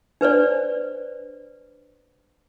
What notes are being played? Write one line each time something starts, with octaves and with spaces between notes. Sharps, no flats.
D4 B4 C5 D5